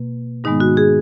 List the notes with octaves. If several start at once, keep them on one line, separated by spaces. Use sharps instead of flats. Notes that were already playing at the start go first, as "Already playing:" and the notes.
Already playing: B2 A#3
G#2 D#3 G#3 B3 D#4
F#4
G#4